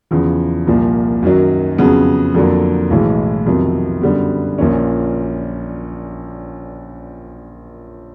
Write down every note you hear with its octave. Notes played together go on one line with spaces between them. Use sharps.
E2 C#3 F3
C2 A#2 F3 A#3
F#2 D#3 F#3
F2 C#3 F#3 B3
F2 D3 F#3 A#3
B1 A2 E3 G#3
F2 C3 D#3 F#3 B3
F#2 D3 G3 B3
A#1 A#2 F3 A#3 C#4